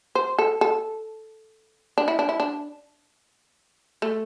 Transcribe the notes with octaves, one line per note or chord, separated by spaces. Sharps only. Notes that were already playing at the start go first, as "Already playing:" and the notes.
C5
A4
A4
D4
E4
D4
E4
D4
A3